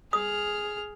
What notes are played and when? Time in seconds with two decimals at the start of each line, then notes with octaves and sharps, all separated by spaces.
0.13 G#4 D#6 F6